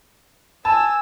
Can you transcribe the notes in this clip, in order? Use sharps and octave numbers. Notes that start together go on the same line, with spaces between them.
G#5 A5 E6